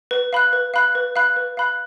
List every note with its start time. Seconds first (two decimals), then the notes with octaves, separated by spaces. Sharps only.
0.11 B4
0.33 F5 B5 F#6
0.53 B4
0.74 F5 B5 F#6
0.95 B4
1.16 F5 B5 F#6
1.36 B4
1.57 F5 B5 F#6